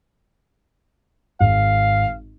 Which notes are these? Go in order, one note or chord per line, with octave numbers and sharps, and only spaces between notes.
G#1 F5